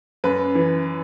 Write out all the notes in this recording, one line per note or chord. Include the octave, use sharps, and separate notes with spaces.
F#2 B4
E3